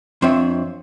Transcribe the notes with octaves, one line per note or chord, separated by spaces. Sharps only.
F2 C4 D4 F4 C#5 E5